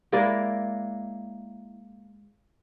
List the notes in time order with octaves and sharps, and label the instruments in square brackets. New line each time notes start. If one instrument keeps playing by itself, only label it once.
[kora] G#3 A#3 E4 D5